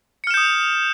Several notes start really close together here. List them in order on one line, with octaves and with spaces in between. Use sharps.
C#7 F6 E7 G6 D#6